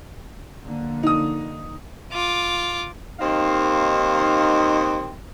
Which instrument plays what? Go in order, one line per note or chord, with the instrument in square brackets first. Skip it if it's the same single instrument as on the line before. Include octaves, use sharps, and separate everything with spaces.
[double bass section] D3 F3 A#3
[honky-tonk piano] D#4 D#6
[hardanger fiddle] F4 D6
[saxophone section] D#2 C4 D#4 F5